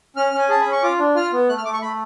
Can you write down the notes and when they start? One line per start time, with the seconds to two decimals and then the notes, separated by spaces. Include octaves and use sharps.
0.16 C#4 F6
0.33 C#4
0.39 G#5
0.49 G#4 A5
0.61 C#4 B5
0.72 C#6
0.83 F4 D6
0.99 D4
1.15 F4 F6
1.33 B3
1.49 A3 F#6
1.58 F6
1.65 A3 D6
1.73 C#6
1.82 A3 B5